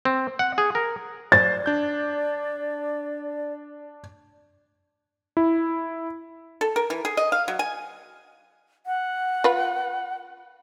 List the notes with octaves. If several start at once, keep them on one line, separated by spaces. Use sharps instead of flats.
C4
F#5
G#4
A#4
C5 D5 A6
D4 G6
E4
A4
A#4
E3
G#4
D#5
F5
F#3
G#5
F#5
F4 B4